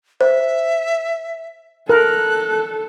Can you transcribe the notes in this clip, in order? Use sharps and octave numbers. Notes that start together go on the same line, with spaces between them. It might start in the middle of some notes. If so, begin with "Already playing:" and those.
C5 E5
A4 A#4 F#6